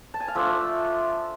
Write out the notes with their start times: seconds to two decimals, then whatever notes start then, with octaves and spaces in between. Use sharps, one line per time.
0.14 A5
0.20 G#5
0.28 F5
0.35 F3 A3 D4 F4 E5